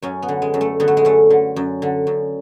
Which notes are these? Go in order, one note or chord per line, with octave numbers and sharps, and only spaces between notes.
F#2 C#4
B3
D3
G#3
F#2
A3
D3 B3
A3
G#3
F#2 A3
D3
F#2
D3
F#2